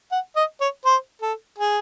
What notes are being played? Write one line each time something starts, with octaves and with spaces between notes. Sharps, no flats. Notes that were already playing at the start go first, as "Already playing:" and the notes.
F#5
D#5
C#5
C5
A4
G#4